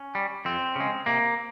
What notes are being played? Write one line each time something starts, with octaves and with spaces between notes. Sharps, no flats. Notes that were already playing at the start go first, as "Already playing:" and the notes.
Already playing: C#4
G3
F2 C4
C#3 G#3
C3 A#3